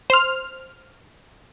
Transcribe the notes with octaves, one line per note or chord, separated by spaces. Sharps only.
C5 F6